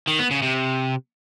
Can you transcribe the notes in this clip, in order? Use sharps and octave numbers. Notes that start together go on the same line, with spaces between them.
D#3
B3
C#3
C3